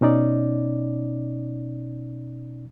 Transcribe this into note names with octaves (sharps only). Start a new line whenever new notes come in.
B2 C#4 D#4 D5